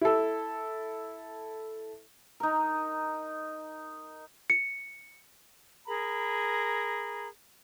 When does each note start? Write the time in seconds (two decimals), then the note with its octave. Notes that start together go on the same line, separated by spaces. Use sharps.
0.01 E4 A4
2.40 D#4 A#4
4.50 C#7
5.87 G#4 A#4 A#5 B5